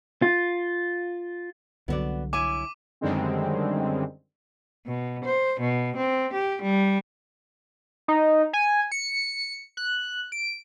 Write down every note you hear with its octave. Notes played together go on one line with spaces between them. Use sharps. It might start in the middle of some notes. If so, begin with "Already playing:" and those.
F4
C2 D3 F#3 B3 F#4 D5
E4 C#5 G#5 D6 D#7
F#2 D3 D#3 G3 G#3 C4
B2
C5
B2
C4
G4
G3
D#4
G#5
C#7
F#6
D7